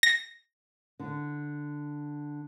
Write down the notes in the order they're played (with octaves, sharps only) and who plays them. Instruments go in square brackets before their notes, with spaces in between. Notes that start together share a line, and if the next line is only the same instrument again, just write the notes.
[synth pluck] A#6
[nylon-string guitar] D3